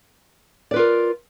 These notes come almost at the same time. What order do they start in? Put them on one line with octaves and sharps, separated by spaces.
D5 B4 F4 A#4